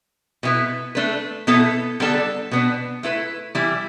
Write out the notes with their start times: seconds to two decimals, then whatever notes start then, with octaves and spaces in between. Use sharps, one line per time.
0.43 B2 B3 E4 B4
0.95 A3 D4 B4
1.47 B2 B3 E4 A4
2.00 D3 G3 B3 D4 A4
2.51 B2 B3 D4
3.03 A3 E4 B4
3.55 E3 G3 E4